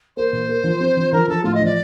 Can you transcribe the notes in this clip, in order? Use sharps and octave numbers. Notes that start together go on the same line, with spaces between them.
A#3 C5
A#2
A#3
F3
C4
F3
F3 A#4
F3 A4
A2 F4
D#5
F3 D5